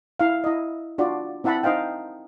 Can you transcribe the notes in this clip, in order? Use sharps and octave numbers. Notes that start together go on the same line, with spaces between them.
E4 F5
E4 D#5
D4 F4 F#4 D5
C4 E4 E5 F#5 A5 B5
D#4 C5 D#5 F5 G5